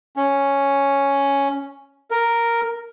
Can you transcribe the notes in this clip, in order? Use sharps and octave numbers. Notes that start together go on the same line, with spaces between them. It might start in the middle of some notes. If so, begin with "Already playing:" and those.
C#4
A#4